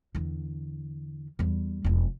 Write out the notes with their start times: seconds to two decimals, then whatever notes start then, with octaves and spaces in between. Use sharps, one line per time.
0.15 E2 D3
1.39 E2 G3
1.84 E1 F2